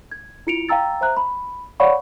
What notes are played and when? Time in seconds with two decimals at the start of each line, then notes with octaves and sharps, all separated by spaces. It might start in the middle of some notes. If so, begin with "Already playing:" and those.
0.11 G#6
0.47 E4 F4 C#7 D7 F7
0.69 F5 G5 A#5 E6 A6
1.01 C5 E5 A#5 F#6
1.17 B5
1.80 C#5 D5 F5 F#5 B5 C#6